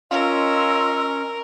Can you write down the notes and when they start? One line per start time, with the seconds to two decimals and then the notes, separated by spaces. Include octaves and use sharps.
0.11 C#4 F4 A#4 D#5 C6 E6